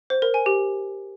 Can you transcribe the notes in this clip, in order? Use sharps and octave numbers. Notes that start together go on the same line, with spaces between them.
C5
A#4
G#5
G4